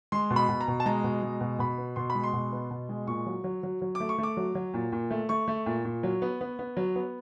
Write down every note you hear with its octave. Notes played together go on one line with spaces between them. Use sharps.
G#3 C6
B2
B5
B2
A#5
B2
A5
G#3 A#5
B2
G#3
B2
B2 B5
B3
B2 C6
B5
G#3
C6
B2
B3
B2
G#3
A#2 C#6
F#3
F#3
F#3
F#3
D6
A3
C#6
A3
D6
F#3
F#3
A#2
A#2
A3
A3 C#6
A3
A#2
A#2
F#3
B3
B3
B3
F#3
B3